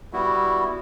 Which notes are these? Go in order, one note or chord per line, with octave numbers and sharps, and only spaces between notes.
G3 B3 E4 F#4